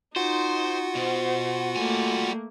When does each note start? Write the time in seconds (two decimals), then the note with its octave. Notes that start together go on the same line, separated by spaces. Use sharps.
0.16 D#4 F4 F#4 C5 F#5
0.95 B2 C5
1.76 G3 A3 A#3 G#5